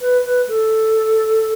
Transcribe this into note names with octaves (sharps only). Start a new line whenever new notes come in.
B4
B4
A4